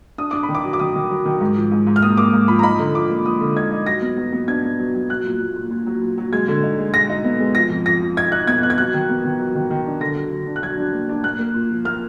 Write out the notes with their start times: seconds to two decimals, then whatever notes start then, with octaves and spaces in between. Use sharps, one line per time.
0.18 D4 D#6
0.31 D4 D6
0.43 B5
0.49 D#3
0.55 D6
0.64 F#3
0.73 D6
0.79 D#3 D#6
0.95 D#3
1.11 F#3
1.25 D#3
1.40 G#2
1.56 F3
1.71 G#2
1.87 G#2
1.96 F6
2.02 A#3 D#6
2.17 A#3 D6
2.33 G#2
2.48 F3 B5
2.59 A#5
2.63 D#4 B5
2.79 D3
2.94 F3 D6
3.10 A#3
3.25 F3 D#6
3.41 D3
3.56 D#4 G#6
3.72 D#4
3.86 F#3 A#6
4.02 B3
4.17 F#3
4.33 B3
4.48 D4 G#6
4.64 B3
4.79 F#3
4.95 F#3
5.09 F#3 F#6
5.25 A#2
5.40 A#2
5.56 A#2
5.71 A#2
5.87 F#3
6.02 A#2
6.18 F#3
6.33 G#3 G#6
6.48 D3
6.64 D#4
6.78 G#3
6.94 G#3 A#6
7.10 D#4
7.24 B3
7.40 G#3
7.55 F3 A#6
7.70 F2
7.86 F2 A#6
8.01 F3
8.17 D#4 G#6
8.32 D#4 F#6
8.47 B3 G#6
8.62 D#4 F#6
8.70 G#6
8.78 F#3 F#6
8.94 D#3
9.09 B3
9.24 D#3
9.39 F#3
9.55 D#3
9.70 D#3
9.86 D4
10.01 D3 A#6
10.16 F#3
10.32 D3
10.47 D4
10.56 F#6
10.62 F#3 G#6
10.77 D4
10.93 A#3
11.09 D4
11.24 A#3 F#6
11.39 A#3
11.54 A#2
11.71 F3
11.85 A#3 F6